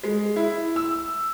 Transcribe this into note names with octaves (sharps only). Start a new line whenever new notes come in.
G#3
E4
E6